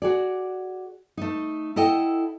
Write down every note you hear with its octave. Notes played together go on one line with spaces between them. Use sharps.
F#4 G#4 D5
A3 D#4
E4 A4 D#5 F#5 G5